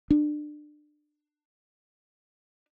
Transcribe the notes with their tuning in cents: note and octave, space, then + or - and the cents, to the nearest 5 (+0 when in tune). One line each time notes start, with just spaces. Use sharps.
D4 +25